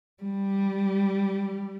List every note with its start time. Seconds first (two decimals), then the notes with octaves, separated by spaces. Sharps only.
0.23 G3